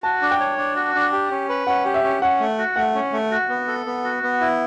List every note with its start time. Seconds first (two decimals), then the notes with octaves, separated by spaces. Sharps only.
0.03 F#4 A5
0.22 D4
0.31 G5
0.40 C#5
0.58 D4
0.76 F#4
0.95 D4
1.12 G4
1.31 C#4
1.49 B4
1.67 C#4 F#5
1.85 G4
1.94 E5
2.03 C#4
2.22 C#4 F#5
2.40 A3
2.58 F#4
2.76 A3 F#5
2.95 C#4
3.13 A3
3.31 F#4
3.49 B3
3.68 A4
3.86 B3
4.04 F#4
4.23 B3
4.41 E4